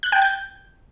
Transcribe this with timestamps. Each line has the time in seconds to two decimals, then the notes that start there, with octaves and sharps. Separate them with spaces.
0.03 F#6
0.12 G5
0.22 G6